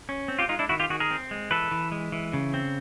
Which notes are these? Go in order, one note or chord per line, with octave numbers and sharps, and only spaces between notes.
C#4
C4
F4 G4
G#3 D#4 F4
D4 E4
D#3 E4 F#4
F4 G4
D#3 F#4 G#4
G#4 A#4
C4
G#3
E3 A4 B4
E3
G#3
E3
C#3
C4